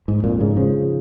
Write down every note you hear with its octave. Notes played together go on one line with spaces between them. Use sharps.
G#2
F2 A#2
G#2 C#3
C#3 F3